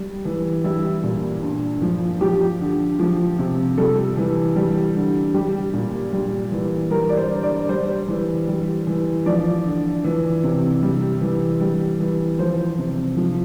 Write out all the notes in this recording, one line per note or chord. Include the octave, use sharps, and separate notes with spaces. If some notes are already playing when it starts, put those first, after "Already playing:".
Already playing: G3
E3
G3 E4
A#2
G2
F3
F3 G4
D3
F3
C3
G3 A4
E3
G3
D3
G3 G4
A#2
G3
E3
G3 A#4
D5
C5
D3
D5
G3 C5
E3
G3
E3
F3 D5
D3
E3
C3
G3
E3
G3
E3
F3 C5
C3
F3